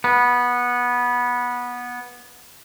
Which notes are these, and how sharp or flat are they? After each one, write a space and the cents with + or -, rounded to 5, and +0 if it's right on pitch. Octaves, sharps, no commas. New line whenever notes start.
B3 -15